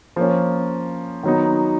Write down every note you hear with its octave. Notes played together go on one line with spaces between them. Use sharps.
F3 A#3 C#4
D#3 F#3 B3 D#4